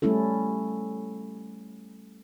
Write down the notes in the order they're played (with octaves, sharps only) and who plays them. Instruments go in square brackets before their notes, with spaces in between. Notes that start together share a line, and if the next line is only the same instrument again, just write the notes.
[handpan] G3 A3 C#4 E4 A4